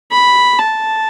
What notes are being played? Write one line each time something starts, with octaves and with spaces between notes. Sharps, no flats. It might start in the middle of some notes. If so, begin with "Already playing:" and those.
B5
A5